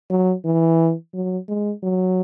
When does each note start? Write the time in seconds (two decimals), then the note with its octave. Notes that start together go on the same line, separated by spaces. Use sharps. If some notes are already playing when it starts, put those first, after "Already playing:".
0.10 F#3
0.45 E3
1.14 F#3
1.49 G#3
1.83 F#3